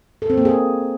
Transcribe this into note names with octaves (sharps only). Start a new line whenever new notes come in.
A4
C4
A#3
G#4